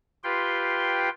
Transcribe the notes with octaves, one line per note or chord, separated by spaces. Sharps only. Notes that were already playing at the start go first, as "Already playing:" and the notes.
F4 G4 B4 G5 C6